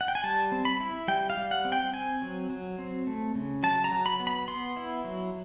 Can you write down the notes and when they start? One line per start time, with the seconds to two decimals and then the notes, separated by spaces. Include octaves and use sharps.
0.01 F#5
0.08 G5
0.15 G#5
0.23 G3 A5
0.52 C4
0.65 B5
0.80 E4
1.08 G3 G5
1.30 F5
1.37 G3
1.51 F#5
1.65 C4
1.72 G5
1.93 C4 G#5
2.22 F#3
2.50 F#3
2.79 C4
3.07 A3
3.35 C#3
3.63 F#3 A5
3.84 A#5
3.91 F#3
4.06 B5
4.20 B3
4.27 B5
4.48 B3 C6
4.77 E4
5.04 F#3